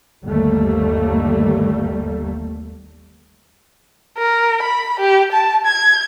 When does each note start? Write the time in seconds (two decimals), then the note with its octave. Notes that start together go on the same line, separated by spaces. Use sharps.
0.24 G1 D#2 G3 A3 A#3
4.18 A#4
4.63 B5
5.00 G4
5.32 A5
5.66 G#6